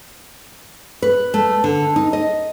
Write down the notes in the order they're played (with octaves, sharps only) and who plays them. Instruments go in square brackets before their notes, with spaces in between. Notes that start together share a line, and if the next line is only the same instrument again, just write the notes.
[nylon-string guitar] B4
A3
D3
D#4
D#5